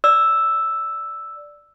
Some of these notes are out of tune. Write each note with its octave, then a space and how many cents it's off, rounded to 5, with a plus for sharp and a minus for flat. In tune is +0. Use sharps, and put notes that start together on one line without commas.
D5 +0 E6 +0